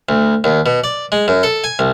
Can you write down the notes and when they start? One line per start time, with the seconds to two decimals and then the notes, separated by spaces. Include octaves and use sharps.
0.09 D2
0.44 D#2
0.66 B2
0.84 D5
1.12 G#3
1.28 F#2
1.43 A4
1.64 G#5
1.79 C2